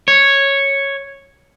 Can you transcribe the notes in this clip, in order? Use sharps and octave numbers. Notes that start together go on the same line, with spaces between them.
C#5